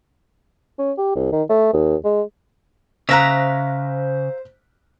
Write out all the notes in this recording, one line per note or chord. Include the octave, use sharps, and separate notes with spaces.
C#4
G4
C2
D#3
A3
D#2
G#3
C#3 C5 E5 F5 A#5 F#6 A#6 B6